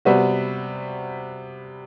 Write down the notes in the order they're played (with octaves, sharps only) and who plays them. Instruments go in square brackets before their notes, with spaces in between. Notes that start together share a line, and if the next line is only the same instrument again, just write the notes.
[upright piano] C3 G3 B3 F#4 B4